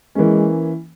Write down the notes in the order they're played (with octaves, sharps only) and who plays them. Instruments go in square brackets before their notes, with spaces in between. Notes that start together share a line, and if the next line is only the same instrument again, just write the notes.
[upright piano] E3 A#3 C#4 [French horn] G#3